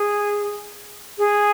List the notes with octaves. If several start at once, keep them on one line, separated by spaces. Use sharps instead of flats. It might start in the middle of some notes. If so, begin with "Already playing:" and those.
Already playing: G#4
G#4